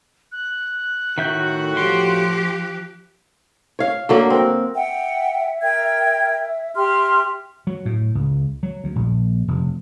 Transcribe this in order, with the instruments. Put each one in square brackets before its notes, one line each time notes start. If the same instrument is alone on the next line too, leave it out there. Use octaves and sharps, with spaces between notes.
[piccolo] F#6
[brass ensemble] A2 F#4 [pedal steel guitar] D#3 E5 G6
[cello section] F3 G4 [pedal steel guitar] C6
[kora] C#5 F5
D3 F#3 A#3
C4 A#4
[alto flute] E5 [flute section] F#5 G5
[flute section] A#4 G5 G#6
[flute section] G4 E5 F6 [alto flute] C6
[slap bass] F#3
A2
C#2
F#3
D2
A#1
F1